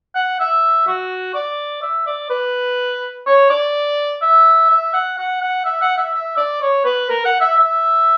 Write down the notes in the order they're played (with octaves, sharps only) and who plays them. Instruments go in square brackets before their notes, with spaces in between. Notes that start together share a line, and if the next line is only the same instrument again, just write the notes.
[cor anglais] F#5
E5
F#4
D5
E5
D5
B4
C#5
D5
E5
E5
F#5
F#5
F#5
E5
F#5
E5
E5
D5
C#5
B4
A#4
F#5
E5
E5